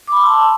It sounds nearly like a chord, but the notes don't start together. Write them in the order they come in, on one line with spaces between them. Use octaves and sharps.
D6 B5 C6 E6 A5